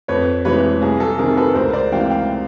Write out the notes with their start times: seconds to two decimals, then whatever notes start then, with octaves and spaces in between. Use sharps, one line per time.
0.08 F2 B4 C#5
0.45 C3 E3 G#3 B4 C#5
0.81 C2 G#4
1.00 A4
1.18 C3 D#3 G#4 A#4
1.37 A4 B4
1.55 C#2 A#4 C5
1.73 C5 D5
1.92 C3 E3 G#3 F5 G5
2.10 F5 G5